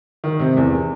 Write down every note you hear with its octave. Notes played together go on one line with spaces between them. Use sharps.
D#3
C3
E2